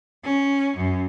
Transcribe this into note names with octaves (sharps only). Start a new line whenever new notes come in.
C#4
F#2